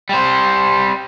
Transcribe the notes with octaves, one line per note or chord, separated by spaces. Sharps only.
G3 C5